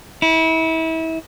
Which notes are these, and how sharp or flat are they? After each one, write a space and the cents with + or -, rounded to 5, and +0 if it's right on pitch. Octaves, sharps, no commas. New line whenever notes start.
E4 -30